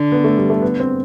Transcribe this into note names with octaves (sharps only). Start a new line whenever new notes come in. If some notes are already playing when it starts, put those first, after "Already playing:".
Already playing: D3
B3
A3
G3
A3
B3
C4